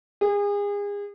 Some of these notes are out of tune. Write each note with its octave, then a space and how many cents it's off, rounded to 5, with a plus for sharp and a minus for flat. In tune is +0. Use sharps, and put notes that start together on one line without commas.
G#4 -35